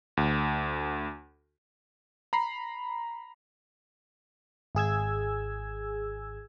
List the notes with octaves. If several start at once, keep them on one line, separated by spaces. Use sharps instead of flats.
D2
A#5 B5 C7
G#1 G#4 E6 G#6